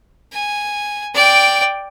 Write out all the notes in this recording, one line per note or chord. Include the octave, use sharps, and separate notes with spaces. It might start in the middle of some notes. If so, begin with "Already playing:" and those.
G#5
D5 G5